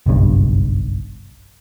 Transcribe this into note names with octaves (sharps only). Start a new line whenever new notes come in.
F#1 B1 G2